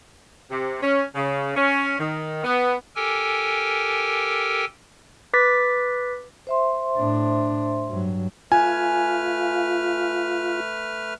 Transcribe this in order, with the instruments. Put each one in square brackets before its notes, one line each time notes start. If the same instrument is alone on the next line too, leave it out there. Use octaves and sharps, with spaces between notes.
[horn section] C3
C#4
C#3
C#4
D#3
B3
[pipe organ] G4 A4 A#4 G5 G#5
[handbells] B4 D6 A6 B6
[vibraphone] C5 E5 C6
[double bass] A2 D4
G2 F#3
[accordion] A3 B4 F6 [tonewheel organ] F4 [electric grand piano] G#5